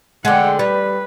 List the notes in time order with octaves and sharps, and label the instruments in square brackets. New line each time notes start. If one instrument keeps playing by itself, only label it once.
[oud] D3 G#3 [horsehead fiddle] F#5 G5
[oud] G3 [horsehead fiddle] B4